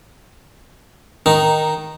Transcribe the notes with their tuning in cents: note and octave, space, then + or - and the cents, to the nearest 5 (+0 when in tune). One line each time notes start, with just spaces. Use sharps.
D#3 +0 D#4 -10